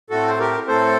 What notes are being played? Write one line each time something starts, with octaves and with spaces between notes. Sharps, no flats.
A2 A3 C4 F#4 A4
C5
G4 A#4
A2 A3 C4 A4 C5